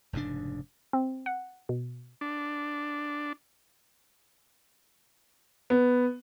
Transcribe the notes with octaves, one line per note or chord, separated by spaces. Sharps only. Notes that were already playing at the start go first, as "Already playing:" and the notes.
F1 G#2 C#3 D4
C4
F#5
B2
D4
B3